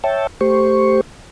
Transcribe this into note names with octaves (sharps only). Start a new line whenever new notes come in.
C#5 E5 G5 A5
A3 G4 C5 C#6